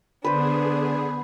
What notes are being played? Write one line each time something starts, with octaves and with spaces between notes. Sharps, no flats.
D3 B3 D4 G#4 B4 C5